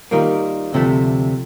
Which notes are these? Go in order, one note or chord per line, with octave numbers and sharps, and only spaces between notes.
D#3 G3 A#3 F4 A#4
D2 C3 F3 A3